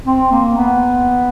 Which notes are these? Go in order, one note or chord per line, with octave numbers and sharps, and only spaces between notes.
C4
A#3
B3